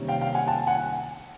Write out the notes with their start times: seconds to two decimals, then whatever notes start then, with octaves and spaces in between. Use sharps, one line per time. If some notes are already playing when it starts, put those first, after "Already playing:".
Already playing: C3 D#3 G3 A#3 C#4
0.08 F5 G5
0.21 F5 G5
0.35 F#5 G#5
0.47 G5 A5
0.67 F#5 G#5